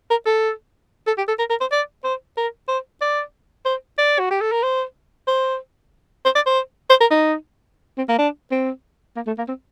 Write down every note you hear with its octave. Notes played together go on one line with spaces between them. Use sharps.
A#4
A4
A4
G4
A4
A#4
A#4
C5
D5
C5
A#4
C5
D5
C5
D5
F#4
G4
A4
A#4
C5
C5
C5
D5
C5
C5
A#4
D#4
C4
A#3
D4
C4
A#3
A3
A#3
C4